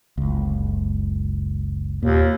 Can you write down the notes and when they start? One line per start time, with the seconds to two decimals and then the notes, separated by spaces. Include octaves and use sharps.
0.18 F#1 C#2
2.03 D#2 A#2